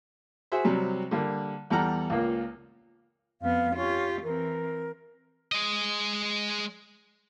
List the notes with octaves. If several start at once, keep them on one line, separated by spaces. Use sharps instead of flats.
F#4 G#4 C5 E5
C3 F#3 G3
D3 G3 A#3
E2 G3 A4 F#5 A#5 F6
C#2 A#2 A#3
F2 B3 F5
C#4 F4 G4
E3 C4 A#4
G#3 D#5